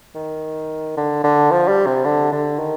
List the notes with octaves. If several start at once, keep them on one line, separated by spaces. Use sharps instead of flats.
D#3
D3
D3
F3
G3
C3
D3
D3
D#3